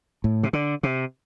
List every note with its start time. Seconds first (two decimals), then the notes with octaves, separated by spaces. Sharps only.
0.24 A2
0.43 C3
0.53 D3
0.83 C3